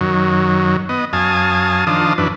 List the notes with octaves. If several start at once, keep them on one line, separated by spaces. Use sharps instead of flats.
F#2 D#3 F#3
B3 D#5
F#2 F5 G#5 A5 D#6
D#3 F3 D4 F5 A5 D#6
F#2 E3 D4 B4